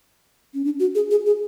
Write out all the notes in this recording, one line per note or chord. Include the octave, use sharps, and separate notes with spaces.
C#4
D4
F#4
G#4
G#4
G#4